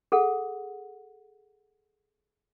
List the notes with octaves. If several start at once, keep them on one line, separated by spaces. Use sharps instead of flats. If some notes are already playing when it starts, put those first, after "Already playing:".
G#4 A4 F#5